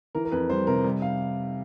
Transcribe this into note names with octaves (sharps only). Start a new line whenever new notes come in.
E3 A#4
A#4
F2 B4
G3 C5
C3 A#4
G3
F5